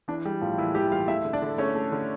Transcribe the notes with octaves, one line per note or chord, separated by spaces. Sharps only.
E3 D4
G3
A2 F3 F4
E3 A#3 E4
E3 G3 G4
G3 F4 F5
A3 E4 E5
D3
D4 D5
D3
A3 C#4 C#5
A3
D3